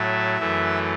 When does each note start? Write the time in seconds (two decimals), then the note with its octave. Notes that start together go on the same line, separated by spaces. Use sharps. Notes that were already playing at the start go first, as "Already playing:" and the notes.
Already playing: A2 F#3 A3 E5
0.38 F#2 E3 A3